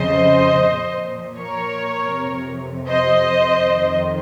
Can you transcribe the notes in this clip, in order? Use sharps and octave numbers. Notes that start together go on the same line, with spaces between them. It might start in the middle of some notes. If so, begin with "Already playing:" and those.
Already playing: F2 C#3 F3 C5 D#5
A#2 F3
A#4 C#5
F2 C3 F3
C5 D#5
F2 D#3